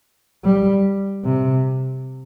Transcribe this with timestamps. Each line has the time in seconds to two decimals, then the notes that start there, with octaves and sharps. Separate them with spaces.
0.44 G3
1.25 C3